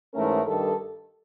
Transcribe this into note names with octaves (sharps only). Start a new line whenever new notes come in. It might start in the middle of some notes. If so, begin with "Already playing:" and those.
G#2 E3 A3 C#4 A#4
G2 D#3 A4